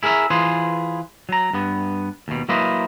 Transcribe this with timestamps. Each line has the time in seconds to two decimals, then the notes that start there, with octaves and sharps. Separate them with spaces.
0.03 E4 G#4 A#4 B4 E5
0.30 E3 F4 G#4 B4 C5
1.29 F#3 A#5
1.53 G2 B3
2.28 D#2 B2
2.49 F#3 A#3 E4 B4 C5 D#5